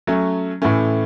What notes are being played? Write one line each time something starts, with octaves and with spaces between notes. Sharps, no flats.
F#3 A3 C#4
A2 E3 A3 C#4